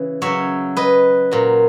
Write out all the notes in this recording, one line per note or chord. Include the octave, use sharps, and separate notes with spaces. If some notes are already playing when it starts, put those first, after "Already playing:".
Already playing: C#3 E3
C#3 F#3 C#5 E5
B4 D#5
A#2 F#3